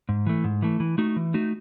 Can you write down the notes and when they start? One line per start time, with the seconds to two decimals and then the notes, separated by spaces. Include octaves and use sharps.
0.09 G#2
0.27 E3 A3
0.44 G#2
0.62 E3 A3
0.80 E3
0.98 A3 D#4 F#4
1.16 E3
1.34 A3 D#4 F#4